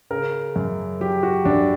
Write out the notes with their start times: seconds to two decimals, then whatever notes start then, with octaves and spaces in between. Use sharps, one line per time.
0.11 C#3 A#4
0.56 F#2
1.00 F#3 G4
1.23 F#4
1.45 F#2 D4